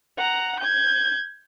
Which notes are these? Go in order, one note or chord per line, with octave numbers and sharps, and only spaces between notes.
F#5 A#5
G6 G#6